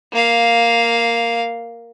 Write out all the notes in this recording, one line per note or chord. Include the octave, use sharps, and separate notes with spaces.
A#3 F5